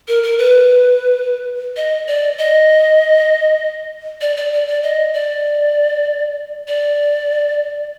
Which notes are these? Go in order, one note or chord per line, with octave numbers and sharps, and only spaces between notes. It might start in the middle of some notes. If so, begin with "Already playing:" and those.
A#4
A#4
B4
D#5
D5
D#5
D5
D5
D5
D5
D#5
D5
D5